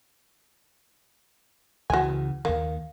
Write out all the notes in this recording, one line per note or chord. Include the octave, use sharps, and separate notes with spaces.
C#2 C#3 E3 F#4 G#5
D#2 D#3 A#3